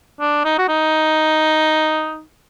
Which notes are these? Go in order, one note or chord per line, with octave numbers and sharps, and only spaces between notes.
D4
D#4
F#4
D#4